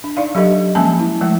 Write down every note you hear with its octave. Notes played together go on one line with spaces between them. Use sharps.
D4
D#4 D5 F5
F#3 D4 G4 A4 D#5
F3 G#3 A#3 C#4 G#5 A5
E4
F3 G#3 A3 E4